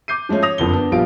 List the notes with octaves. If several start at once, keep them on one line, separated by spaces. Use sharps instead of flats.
D6 G6 C7 D#7
F3 G#3 A3 C#4
C#5 D#6 A#6 F7
F#1 F2 D3 G7
B3 D4
A#1 F3 G3 B3 F4 D7